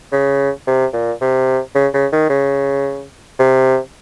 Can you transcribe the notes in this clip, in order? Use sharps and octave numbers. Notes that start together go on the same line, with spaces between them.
C#3
C3
A#2
C3
C#3
C#3
D#3
C#3
C3